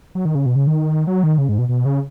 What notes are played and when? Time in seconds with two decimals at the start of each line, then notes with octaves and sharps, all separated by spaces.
0.15 F#3
0.25 D#3
0.35 C#3
0.46 B2
0.56 C#3
0.67 D#3
1.07 F#3
1.23 D#3
1.38 C#3
1.49 G#2
1.58 B2
1.69 B2
1.85 C#3